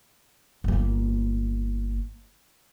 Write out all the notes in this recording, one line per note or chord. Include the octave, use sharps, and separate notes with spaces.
G1 A#3